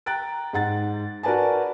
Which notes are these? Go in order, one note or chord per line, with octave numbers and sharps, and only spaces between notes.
G5 A#5 F#6 A6 D7
G#2 F#5 A6
F#4 A#4 B4 D5 G#5 A5